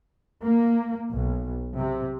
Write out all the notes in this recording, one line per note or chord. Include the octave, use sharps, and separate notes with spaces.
A#3
B1
C3